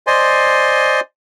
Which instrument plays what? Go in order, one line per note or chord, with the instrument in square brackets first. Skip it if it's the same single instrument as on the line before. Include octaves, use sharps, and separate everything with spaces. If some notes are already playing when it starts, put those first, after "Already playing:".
[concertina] C5 D5 D#5 G#5 C6